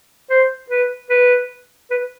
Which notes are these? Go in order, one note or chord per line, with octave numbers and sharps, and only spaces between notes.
C5
B4
B4
B4